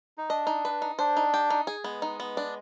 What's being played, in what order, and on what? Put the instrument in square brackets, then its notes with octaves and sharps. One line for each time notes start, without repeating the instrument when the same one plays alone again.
[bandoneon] D#4
[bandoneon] D4 [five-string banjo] D#5
[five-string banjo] D#4
B4
D#4
[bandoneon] D4 [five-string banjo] C5
[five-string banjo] D#4
G4
D#4
G#4
[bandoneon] G#3 [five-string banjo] B3
[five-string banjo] D#4
B3
D4